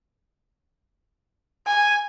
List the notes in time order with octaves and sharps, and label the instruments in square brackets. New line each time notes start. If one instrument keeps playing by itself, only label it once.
[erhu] G#5